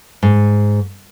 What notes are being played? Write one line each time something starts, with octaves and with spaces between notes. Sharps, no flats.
G#2